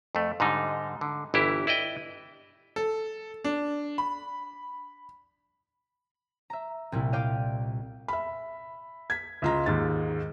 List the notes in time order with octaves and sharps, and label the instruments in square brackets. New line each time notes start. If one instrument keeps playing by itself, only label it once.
[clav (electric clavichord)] F2 A3
G#2 D3 G3 D#4
D3
G1 E3 E4 G4
E4 D5 D#5 G5
[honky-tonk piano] A4
D4
B5
[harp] E5 A#5
C2 A#2 G3 E4
D5 D#5 F5 G5 D6
[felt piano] E5 B5
G#6 B6
C#2 F4 A#5
D#2 G#2 A6